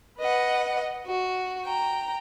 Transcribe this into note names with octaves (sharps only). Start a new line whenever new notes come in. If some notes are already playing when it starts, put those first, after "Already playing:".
B4 D#5 F#5
F#4
G5 A#5